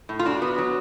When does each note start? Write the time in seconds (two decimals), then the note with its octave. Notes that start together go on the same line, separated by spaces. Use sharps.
0.09 A2
0.19 F4
0.26 D4 F#4
0.42 B3
0.58 F#3